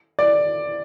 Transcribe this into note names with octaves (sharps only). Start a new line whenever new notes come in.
D5